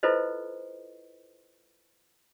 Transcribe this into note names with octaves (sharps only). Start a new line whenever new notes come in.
E4 F4 A4 B4 C5 D#5